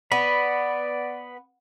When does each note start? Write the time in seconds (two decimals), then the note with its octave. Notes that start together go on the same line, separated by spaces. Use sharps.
0.12 B3 D5 B5